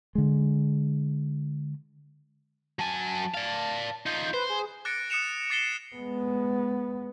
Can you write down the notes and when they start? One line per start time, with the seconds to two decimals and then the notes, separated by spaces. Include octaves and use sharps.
0.15 D3 G#3
2.79 F#3 G#5 A5
3.34 D5 F5
4.06 D#4 F4 G6
4.34 B4 C5
4.49 G#4
4.85 D6 F#6 A6 A#6 C#7 D7
5.10 D#6 F#6 C#7 E7 F7
5.50 D6 A6 C7 E7 G7
5.96 G#3 B3